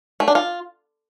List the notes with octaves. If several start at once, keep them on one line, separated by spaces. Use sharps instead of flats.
A3
D4
F4